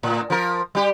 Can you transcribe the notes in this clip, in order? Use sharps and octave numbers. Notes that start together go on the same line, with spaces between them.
A2
F3 A#4
G3 G4